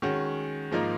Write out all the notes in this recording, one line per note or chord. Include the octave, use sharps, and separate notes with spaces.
D#3 G#3 C#4 F#4
G#2 F3 A#3 D#4